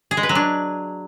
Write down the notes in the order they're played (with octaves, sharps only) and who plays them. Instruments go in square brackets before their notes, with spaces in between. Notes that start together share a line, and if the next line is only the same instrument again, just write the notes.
[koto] G#4
G#3
B4
F#3
D4